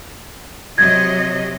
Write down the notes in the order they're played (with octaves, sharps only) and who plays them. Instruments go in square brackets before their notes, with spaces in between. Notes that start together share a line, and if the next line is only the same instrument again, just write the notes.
[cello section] C3 F#3 D#5 [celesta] G#6